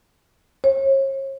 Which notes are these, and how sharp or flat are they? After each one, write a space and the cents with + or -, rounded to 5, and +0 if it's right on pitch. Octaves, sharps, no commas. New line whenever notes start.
C#5 -40